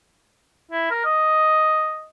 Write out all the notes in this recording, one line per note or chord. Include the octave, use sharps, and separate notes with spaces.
E4
A#4
D#5